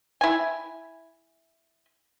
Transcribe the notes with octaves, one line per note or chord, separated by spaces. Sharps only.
E4 G#5